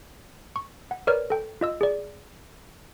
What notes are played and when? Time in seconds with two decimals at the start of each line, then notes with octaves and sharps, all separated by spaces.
0.56 C#6
0.91 F#5
1.07 A#4 B4 C#5 D5 F6
1.30 A4 G5
1.61 F4 D#5 E6
1.81 G#4 D5